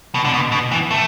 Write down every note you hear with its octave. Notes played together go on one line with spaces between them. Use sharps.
B2
D3
B2
B2
E3
A3